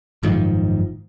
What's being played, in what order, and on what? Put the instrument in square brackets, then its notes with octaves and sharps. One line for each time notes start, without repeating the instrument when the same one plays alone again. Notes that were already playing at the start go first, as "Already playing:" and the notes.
[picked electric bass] F#1 G#2 D#3 F3